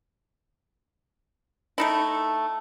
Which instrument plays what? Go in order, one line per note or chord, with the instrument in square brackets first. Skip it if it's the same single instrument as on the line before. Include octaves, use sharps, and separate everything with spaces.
[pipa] A3 D#4 E4